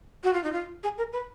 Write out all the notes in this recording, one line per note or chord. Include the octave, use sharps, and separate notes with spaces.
F#4
F4
D#4
F4
G#4
A#4
B4